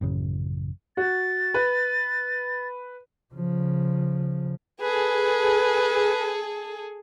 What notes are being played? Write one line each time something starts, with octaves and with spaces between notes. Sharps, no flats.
A1 F#2 C#3
F#4 A6
B4
C#3 F3
G#4 A4 B4